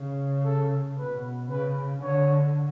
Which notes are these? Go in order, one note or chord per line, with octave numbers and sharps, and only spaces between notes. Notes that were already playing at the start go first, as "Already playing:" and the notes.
Already playing: C#3
A4
B2 B4
C#3 B4
D3 C#5